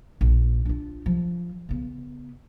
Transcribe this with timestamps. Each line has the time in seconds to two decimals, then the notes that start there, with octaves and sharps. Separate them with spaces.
0.21 A#1
0.65 D4 F4
1.06 F3
1.69 C#3 B3